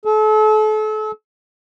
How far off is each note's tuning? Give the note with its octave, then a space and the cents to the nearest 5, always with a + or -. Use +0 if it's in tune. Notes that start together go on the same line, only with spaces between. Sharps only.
A4 -35